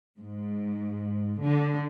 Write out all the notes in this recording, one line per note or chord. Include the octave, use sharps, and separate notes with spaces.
G#2
D3